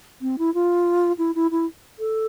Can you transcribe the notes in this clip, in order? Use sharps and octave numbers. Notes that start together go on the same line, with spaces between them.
C4
E4
F4
E4
E4
E4
A4